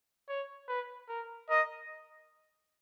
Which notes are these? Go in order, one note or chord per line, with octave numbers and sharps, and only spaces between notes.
C#5
B4
A#4
A#4 D#5